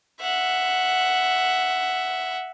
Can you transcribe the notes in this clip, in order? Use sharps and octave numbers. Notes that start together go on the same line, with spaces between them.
E5 F#5